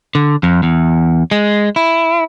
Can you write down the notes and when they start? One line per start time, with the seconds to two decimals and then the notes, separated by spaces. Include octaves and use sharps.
0.15 D3
0.43 F2
0.63 E2
1.31 G#3
1.76 E4